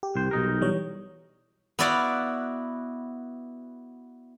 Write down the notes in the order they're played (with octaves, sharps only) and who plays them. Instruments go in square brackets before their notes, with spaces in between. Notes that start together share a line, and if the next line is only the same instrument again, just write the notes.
[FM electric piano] G4
[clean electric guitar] C2 C5
B1 D#4 A#4
[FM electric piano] E3 G3 C#5
[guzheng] B3 E4 F#4 D5 F5 F#5